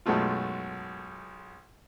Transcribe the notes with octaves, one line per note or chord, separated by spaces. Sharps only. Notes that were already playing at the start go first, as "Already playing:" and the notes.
B1 F#2 G#3 A3 F4